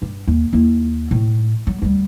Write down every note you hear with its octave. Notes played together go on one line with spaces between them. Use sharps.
G2
D#2
D#2 E4
A2
F#3
D2 G3